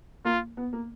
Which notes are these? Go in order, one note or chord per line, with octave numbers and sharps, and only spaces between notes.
A#3 F4
B3
A#3